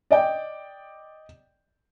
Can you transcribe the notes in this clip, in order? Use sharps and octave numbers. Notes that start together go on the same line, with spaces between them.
D5 D#5 G5